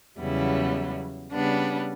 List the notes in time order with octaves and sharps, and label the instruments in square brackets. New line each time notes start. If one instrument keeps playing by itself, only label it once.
[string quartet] E2 C#3 F#3 G3 B3 E4
C#3 G3 B3 D4